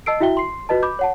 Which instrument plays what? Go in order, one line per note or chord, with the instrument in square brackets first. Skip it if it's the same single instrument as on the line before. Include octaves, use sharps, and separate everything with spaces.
[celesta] D#5 A5 E6 C7 D7
E4 F#4 E5 G5 G7
C6 C7
F4 F#4 B4 D#5 A5
B5 D6 G6
C#5 F#5 A5